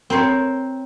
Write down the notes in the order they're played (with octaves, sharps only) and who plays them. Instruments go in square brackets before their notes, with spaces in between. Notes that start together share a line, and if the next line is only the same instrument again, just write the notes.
[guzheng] C4 A#4 C5 C#5